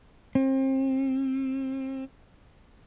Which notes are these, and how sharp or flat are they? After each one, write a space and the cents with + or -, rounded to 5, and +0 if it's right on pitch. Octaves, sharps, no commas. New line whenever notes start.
C4 +30